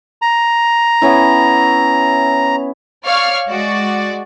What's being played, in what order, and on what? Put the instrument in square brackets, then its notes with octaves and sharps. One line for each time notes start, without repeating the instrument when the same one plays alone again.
[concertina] A#5
[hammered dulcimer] B3 C#4 E4
[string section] C#5 D5 F5 F6
G#3 F#4 D5